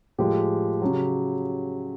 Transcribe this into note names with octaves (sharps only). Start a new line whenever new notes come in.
A2 F3 G#3 G4
C#3 F#3